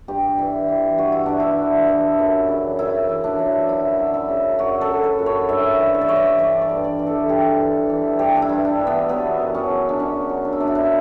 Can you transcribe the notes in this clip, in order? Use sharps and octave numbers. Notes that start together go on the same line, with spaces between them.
G2 G4
E3
E3
G2 F#4
E4
G2 D4
E4
E3
E3
F#2
C#3
F#2 E4
E3
D4
F#2
F#3 E4
F#2
E4
C#3
F#2 F#4
A4
F#3
B4
F#2
C#5
G2 E5
E3
E5
D5
E3 C#5
D5
G2 D5
D5
G2
D5
E3
A4
G2 G4
E3
E3
G2 G4
D4
E4
G2
D4
E3
B3
F#3 B3
F#2
C#4
C#3
D4
F#2 C#4
F#3
D4
E4
F#2 D4
E4
D4